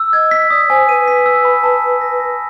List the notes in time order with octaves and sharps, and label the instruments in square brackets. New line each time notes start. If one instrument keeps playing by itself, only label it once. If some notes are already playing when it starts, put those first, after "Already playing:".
Already playing: [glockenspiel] E6
[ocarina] D#5 [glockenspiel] G#6
[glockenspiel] B6
[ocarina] D5 [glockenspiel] D#6
[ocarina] C5 [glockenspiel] G#5
[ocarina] B4 [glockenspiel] D#7
[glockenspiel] B6
E6
B5
A5
A5
A#6
A#6